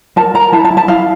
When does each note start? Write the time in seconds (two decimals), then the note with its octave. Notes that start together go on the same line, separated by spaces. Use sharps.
0.16 A#4 A5
0.34 A#4 A#5
0.52 E4 A5
0.65 A5
0.71 E4
0.77 A5
0.88 E4 F5